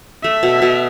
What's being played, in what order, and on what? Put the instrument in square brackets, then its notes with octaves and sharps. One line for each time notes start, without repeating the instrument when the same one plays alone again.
[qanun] A3 [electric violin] E5
[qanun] B2
B2